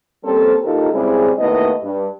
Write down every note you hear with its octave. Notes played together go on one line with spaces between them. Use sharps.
G3 A#3 C4 C#4 A4 C5
D#2 D#4 F4 G4 A4 A#4
C#3 G3 G#3 C4 E4 G#4
D#2 A3 B3 E4 D#5
G2